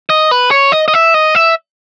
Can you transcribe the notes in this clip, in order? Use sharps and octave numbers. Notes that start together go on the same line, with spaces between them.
D#5
B4
C#5
D#5
D#5
E5
D#5
E5